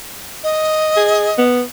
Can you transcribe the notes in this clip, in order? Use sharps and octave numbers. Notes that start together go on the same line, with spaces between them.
D#5
G#4
B3